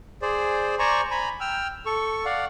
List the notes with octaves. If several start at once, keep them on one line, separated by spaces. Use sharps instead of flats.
G#4 C5 D5
C5 D5 G#5 A#5 C#6
G#5 A#5 B5
G5 E6 F6
A4 C#6
D5 F5 F#5